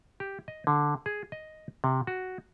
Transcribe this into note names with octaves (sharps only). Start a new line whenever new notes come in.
G4
D#5
D3
G#4
D#5
C3
F#4